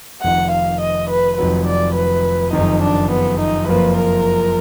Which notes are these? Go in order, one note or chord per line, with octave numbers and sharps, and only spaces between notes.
F1 F2 D#3 F#5
F5
D#5
B4
F1 F2 D#3 F#3 B4
D5
B4
F#1 F2 D#3 D#4
D4
B3
D#4
F#1 F2 F3 A#3 F4 B4
A#4